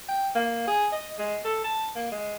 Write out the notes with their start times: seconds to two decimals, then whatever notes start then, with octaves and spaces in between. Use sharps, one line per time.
0.08 G5
0.35 A#3
0.67 G#4
0.92 D#5
1.18 G#3
1.45 A4
1.64 A5
1.95 A#3
2.12 G#3